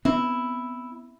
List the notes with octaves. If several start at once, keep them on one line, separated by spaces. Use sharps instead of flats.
B3 C4 E4